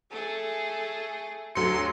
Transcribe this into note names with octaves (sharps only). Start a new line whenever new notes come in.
A3 G#4 A4
D2 F#3 A4 C6 C#7